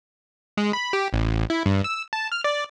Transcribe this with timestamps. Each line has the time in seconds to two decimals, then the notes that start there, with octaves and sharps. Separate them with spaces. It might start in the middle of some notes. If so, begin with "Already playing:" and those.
0.57 G#3
0.73 B5
0.93 G4
1.13 A1
1.50 E4
1.66 G2
1.84 E6
2.13 A5
2.32 F6
2.44 D5